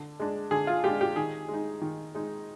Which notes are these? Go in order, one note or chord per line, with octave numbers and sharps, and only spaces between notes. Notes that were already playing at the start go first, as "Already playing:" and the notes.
Already playing: D3
G#3 D4
D3 G#4
F4
G#3 D4 G4
G4
D#3 G#4
G#3 D#4
D#3
G#3 D#4